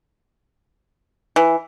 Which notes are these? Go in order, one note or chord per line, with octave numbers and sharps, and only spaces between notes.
E3